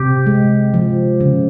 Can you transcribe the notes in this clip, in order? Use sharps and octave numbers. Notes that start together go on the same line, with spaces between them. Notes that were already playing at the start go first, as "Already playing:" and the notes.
Already playing: C3 G4
G#3
F3
C#3